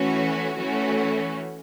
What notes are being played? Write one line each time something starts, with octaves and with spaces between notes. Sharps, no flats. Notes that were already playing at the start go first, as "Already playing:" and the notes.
Already playing: E3 A3 C#4 F#4
E3 A3 C#4 F#4